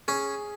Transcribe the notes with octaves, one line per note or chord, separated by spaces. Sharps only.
C#4 G#4